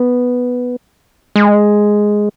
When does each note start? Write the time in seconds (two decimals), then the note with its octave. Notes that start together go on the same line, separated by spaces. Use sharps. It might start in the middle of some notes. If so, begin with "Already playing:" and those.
Already playing: B3
1.36 G#3